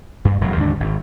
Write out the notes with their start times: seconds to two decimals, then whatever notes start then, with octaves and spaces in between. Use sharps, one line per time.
0.25 G2
0.41 E1 F#3
0.56 D#2 G#2 D3 D4
0.80 G#1